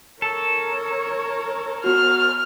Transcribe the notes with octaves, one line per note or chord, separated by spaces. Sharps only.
A4 A#4 C#5
B3 F#4 F6